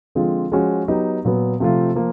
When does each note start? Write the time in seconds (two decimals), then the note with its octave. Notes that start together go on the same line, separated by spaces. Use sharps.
0.15 D3 F3 G#3 C4 F4
0.52 F3 G#3 C#4 F#4
0.88 F#3 B3 D#4 G4
1.25 A#2 F#3 B3
1.60 C3 F3 A3 C4 F4
1.96 F3 A#3